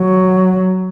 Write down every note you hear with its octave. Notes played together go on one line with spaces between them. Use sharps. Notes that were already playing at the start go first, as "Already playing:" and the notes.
Already playing: F#3